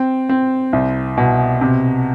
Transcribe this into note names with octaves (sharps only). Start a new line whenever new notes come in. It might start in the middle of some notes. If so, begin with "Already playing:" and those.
Already playing: C4
C4
C2
B2
C3